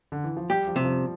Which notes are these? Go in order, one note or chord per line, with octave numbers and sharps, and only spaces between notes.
D3
E3
F3
G3 G4
F3
C3
F3